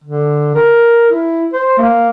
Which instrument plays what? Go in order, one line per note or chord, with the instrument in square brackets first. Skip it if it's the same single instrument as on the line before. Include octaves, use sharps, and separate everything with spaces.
[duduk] D3
A#4
E4
C5
A#3